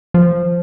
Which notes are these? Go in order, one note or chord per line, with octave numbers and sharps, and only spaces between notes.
F3